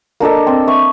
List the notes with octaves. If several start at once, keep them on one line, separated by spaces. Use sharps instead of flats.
A#3 D4 A4 D#5
C4
E5 C#6